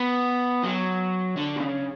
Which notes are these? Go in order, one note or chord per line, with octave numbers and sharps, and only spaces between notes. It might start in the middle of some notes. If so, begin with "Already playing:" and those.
Already playing: B3
F#3
D3
B2
C#3